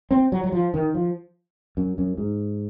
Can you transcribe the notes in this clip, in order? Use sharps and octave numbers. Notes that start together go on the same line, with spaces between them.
C4
F#3
F#3
F3
D#3
F3
F#2
F#2
G#2